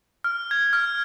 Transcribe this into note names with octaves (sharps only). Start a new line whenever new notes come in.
F6
G#6
F6